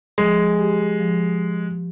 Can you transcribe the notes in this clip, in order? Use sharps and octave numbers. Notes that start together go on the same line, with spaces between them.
F3 G#3
G4
F3